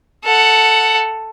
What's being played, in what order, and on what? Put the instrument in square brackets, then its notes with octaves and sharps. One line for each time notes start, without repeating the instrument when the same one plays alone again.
[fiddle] A4 F#5